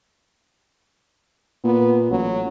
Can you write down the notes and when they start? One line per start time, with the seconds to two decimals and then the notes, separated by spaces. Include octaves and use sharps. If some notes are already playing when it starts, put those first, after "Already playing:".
1.65 A#2 B3
2.11 A1 F#3